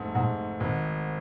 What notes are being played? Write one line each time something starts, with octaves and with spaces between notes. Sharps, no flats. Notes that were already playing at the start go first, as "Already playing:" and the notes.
Already playing: F1 G#2 A3
G#2
G#1